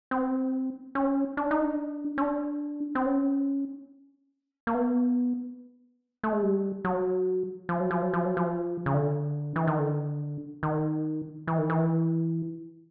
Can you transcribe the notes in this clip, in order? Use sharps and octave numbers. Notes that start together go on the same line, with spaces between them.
C4
C#4
D4
D#4
D4
C#4
D4
C4
C#4
A#3
B3
A3
G#3
G3
F#3
F3
F#3
F3
F#3
F3
F#3
F3
C#3
D3
E3
D#3
D3
D#3
E3
D#3
E3